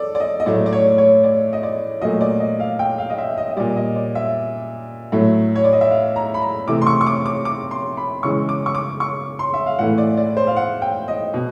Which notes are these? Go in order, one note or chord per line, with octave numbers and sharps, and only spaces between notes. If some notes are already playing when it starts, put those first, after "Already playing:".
Already playing: A4 D5
D5
D#5
D#5
A2 F#3 A3 D5
D5
C#5
C#5
D5
D#5
D5
A#2 F#3 A3 D#5
D5
D#5
F5
G5
F5
D#5
E5
D#5
D#5
A#2 G3 D5
D#5
D5
E5
A2 F#3 A3
C#5
D5
D#5
E5
F5
A#5
B5
A#5
C3 E3 A3 D6
C6
C#6
C#6
D6
D6
D6
C6
B5
C#3 E3 G#3 C#6
D6
C#6
D6
C#6
C6
E5
F5
A2 E3 A3 F#5
D5
D5
C5
F5
F#5
G5
D#5
B2